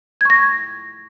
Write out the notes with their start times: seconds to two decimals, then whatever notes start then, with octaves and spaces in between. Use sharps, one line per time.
0.21 G#6
0.25 C#6
0.30 A#6